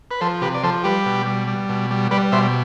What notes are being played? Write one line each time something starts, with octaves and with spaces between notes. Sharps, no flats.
B4
F3 A4 C5
C3 G4 B4
D5
F3 A4 C5
G3 G4 B4
B2
G3
G3
B2
G3
G3 B4 D5
B2 C5 E5